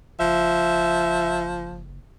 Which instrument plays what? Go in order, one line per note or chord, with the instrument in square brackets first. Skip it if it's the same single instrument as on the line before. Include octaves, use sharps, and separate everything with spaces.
[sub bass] F#1 [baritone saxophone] F3 [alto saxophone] E5